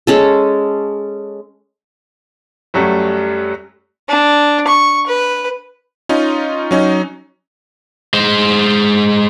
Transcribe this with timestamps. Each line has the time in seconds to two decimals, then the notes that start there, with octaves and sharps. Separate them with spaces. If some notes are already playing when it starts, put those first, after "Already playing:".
0.07 G#3 C#4 A4
2.74 F#2 F#3 G3 A3
4.09 D4
4.67 C#6
5.07 B4
6.09 C#4 D#4 F4
6.71 F#3 C#4 D#4
8.14 G#3 C5